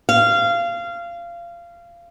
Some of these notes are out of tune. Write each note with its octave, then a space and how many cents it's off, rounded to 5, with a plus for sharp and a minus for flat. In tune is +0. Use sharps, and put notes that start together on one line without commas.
F5 -20